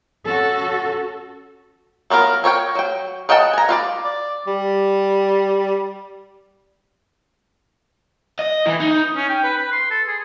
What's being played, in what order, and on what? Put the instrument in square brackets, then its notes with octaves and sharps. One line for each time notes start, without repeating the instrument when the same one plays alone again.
[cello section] C#4 F#4 A4
[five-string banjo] F#3 B3 F4 A#4
A#4 C#5 F5 G5
F#3 G5
A#4 D#5 F#5 G5 A5
G#5 A#5
F4 B4 D5
[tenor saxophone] D5
G3
[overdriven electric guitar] D#5
E3
D#4
[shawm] C#4
G5
B4
B4
C6
A4
G#4